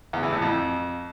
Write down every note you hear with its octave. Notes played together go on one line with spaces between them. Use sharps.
E2
E3
A2
F2